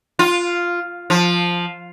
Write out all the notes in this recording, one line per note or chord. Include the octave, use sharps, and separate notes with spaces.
F4
F3